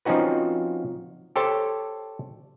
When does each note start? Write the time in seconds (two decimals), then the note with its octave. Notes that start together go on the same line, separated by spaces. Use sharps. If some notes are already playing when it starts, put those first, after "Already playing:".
0.05 F3 C4 C#4 D#4 F#4 B4
1.36 G4 A4 C5 C#5 A5